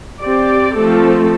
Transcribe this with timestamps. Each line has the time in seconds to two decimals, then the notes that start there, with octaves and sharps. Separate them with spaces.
0.23 C4 G4 D5
0.75 F3 A3 C4 A4